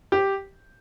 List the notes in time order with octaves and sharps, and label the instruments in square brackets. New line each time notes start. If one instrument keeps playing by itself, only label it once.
[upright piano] G4